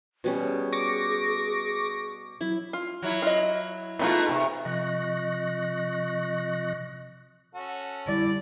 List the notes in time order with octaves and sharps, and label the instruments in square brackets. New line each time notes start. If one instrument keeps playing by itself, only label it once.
[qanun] B2 G3 C#4
[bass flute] G#4
[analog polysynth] C#6 D6 A#6
[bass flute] F#3 [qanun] E4
[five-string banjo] F4
[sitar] F#3 E4
[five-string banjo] F4 D#5
[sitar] B2 A3 F4 [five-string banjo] B3 D#4 G#4
[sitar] C3
[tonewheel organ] C3 F3 D#5 C#6 F#6 A#6
[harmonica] C#4 F#4 A4
[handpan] D3 G3 [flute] E4 [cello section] D5